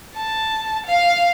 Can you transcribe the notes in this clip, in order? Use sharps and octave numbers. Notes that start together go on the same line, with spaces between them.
A5
F5